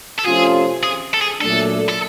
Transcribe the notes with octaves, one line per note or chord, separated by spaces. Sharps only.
A4
C3 F3 A3 C#4 F4 G#4
G#4
A4
G#4
A#2 F#3 A3 D4 A4
A4